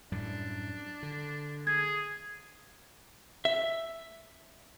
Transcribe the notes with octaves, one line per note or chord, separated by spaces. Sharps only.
F#2 A2 G3 D4
D3
G#4 G#6
E5